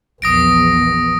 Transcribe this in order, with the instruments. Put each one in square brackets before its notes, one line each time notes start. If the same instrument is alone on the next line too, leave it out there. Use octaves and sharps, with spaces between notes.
[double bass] A#1 E2 [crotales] D#6 A#6 D7